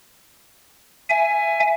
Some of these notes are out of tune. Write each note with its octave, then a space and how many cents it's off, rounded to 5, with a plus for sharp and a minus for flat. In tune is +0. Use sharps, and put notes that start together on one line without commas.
E5 +20 G#5 +0